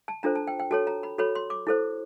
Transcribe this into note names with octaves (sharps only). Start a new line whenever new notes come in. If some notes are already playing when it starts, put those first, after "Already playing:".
A5
D4 F4 A4 C5 A#5
A5
G5
G5
F#4 A4 C#5 A5
A#5
B5
F#4 A4 C#5 B5
C6
D6
E4 A4 C5